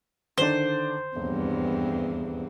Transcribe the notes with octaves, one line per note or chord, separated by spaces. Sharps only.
D3 D#3 D4 C5
D#1 E2 G2 C4